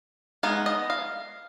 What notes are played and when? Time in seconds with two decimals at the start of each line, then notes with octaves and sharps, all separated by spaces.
0.43 G#3 B3 D#4 F5
0.66 D#5
0.90 F5